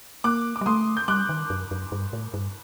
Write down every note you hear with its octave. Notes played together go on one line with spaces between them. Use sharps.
A#3 D6 F#6
D6
G3
A3 C6 D#6
G6
G3 D6 F#6
D#3
F#2
F#2
G2
A2
G2